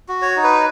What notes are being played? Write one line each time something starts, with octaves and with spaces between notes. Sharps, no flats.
F#4
C#5
D#4
B4